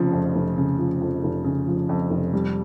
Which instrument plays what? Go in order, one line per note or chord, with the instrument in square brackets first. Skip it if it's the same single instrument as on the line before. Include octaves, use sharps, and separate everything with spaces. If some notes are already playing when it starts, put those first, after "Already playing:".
Already playing: [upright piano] F1 F2 C#3 F3
F2
F1
C#3
F3
F2
F1
C#3
F3
F2
F1
G3